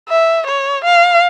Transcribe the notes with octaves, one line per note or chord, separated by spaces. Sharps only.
E5
C#5
F5